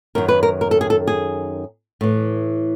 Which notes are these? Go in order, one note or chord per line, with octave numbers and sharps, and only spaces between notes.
F#2 D#3 A#4
B4
A#4
A#4
A4
G#4
A4
G#4
A2 E3